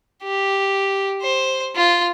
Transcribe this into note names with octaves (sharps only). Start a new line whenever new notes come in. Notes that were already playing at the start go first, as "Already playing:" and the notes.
G4
C5
F4